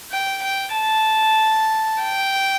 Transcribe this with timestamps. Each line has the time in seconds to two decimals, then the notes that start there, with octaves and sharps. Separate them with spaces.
0.12 G5
0.44 G5
0.76 A5
2.03 G5